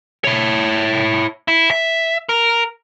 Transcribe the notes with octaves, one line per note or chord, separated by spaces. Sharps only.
E4 C#5
E4
E5
A#4